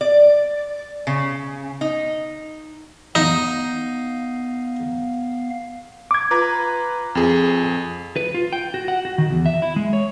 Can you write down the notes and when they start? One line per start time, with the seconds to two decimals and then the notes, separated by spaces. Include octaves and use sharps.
0.01 D5
1.07 C#3
1.81 D#4
3.15 B3 D#4 F5
6.11 D6 G#6
6.31 F4 B4 A#5
7.15 F2 G#4
8.16 B4
8.34 F4
8.53 G5
8.74 F#4
8.88 F#5
9.05 F#4
9.18 D#3
9.30 E2
9.46 E5
9.62 E4
9.76 G#3
9.93 C#5